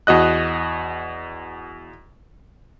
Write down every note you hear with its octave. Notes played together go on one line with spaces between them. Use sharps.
E2 F#4 D#5 F#6